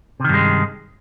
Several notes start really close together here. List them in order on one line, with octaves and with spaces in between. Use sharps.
C3 D#3 G2 G#3